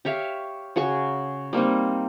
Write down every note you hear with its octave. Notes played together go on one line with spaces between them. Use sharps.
G4 C#5 E5 F5
C#3 F#4 G#4 C#6
G3 A#3 C4 D#4